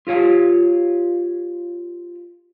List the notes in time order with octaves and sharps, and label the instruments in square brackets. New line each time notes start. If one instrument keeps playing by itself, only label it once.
[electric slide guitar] F4 G4 C#5 F5